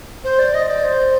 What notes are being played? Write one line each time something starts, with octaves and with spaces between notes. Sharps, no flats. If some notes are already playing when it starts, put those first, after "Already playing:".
C5
D5
D#5
D5
C5